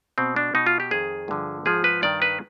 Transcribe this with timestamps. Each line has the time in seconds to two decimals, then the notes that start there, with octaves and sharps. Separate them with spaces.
0.18 B2 C4
0.36 D4
0.55 B2 D#4
0.66 F4
0.80 G4
0.91 F2 D#3 G#4
1.28 G2 D3 F3
1.65 G#2 F3 G#4
1.84 B4
2.02 G2 D#3 D5
2.22 B4